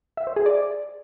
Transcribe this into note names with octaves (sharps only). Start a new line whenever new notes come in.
E5
C5
G#4
D5